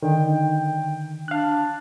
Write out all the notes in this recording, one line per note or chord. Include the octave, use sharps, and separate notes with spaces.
D3 D#3 G5
D4 F5 F#6